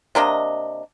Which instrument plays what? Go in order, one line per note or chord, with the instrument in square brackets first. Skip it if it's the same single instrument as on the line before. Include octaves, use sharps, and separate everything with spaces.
[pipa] C3 A#3 D4 D#5